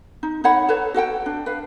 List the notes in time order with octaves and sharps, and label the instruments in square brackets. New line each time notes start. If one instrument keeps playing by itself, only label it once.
[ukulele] D#4
D#4 C#5 F#5 B5
A4 B4 C#5
F#4 A4 F#5 G5
D4
B4 F5